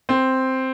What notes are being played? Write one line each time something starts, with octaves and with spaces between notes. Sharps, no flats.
C4